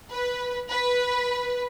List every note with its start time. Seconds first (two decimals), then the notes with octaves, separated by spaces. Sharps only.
0.11 B4
0.70 B4